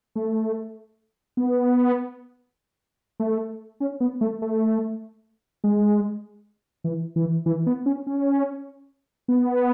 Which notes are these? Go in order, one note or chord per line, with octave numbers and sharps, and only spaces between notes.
A3
B3
A3
C#4
B3
A3
A3
G#3
E3
E3
E3
B3
C#4
C#4
B3